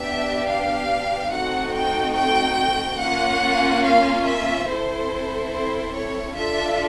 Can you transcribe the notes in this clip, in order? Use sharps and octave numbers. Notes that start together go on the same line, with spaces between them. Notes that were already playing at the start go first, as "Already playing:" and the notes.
Already playing: B3 D4 G4 E5
F5
A3 C4 D#4 F#4 A4 F#5
G5
G5
A#3 C#4 F4 F#5
F5
E5
C4 E4 A4 C5
C5
C#5
D4 F4 A4 E5